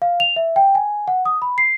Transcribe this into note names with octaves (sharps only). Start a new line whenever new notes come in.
F5
F7
E5
G5
G#5
F#5
D#6
B5
C7